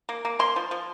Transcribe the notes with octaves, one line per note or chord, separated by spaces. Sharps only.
A#3
A#3
A#3 C6
F3
F3